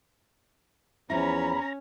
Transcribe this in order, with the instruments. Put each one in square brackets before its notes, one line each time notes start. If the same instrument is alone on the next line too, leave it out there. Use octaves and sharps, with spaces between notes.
[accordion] E2 B5 [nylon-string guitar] F3 E4 [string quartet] C#4 [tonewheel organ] A#5